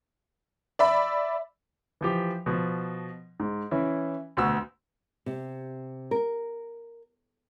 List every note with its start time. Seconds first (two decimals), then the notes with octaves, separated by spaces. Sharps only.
0.79 D5 E5 B5
2.01 E3 F3 G4
2.46 B2 F3
3.40 G#2
3.71 E3 C#4 E4
4.37 D2 B2 F#4 E6
5.26 C3
6.11 A#4